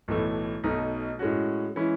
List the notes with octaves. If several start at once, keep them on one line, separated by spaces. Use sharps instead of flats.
B1 A2 E3 A3
B1 B2 A3 D#4
A2 G#3 C#4 F#4
E3 G#3 C#4 E4